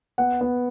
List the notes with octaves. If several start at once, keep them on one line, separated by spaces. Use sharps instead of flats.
B3 F#5
B3